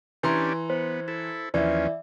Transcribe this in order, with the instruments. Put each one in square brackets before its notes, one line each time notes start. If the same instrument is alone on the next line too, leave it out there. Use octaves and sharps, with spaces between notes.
[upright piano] E3 A#5 C6 [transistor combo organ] C#4 D4 G4
[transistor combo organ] B3 [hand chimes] C5
[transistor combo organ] E4 A4
[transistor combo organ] D#2 F3 C#4 [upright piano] E3 [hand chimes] D5 E5